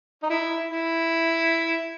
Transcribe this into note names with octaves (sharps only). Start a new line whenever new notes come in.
D#4
E4
E4